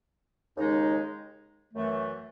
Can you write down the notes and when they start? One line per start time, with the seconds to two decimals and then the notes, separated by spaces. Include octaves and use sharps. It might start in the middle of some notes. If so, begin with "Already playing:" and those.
0.57 D#2 C#3 G#3 D#4
1.74 F#2 E3 A3